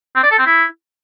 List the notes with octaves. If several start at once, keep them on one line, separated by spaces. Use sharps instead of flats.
C4
D5
A4
C4
E4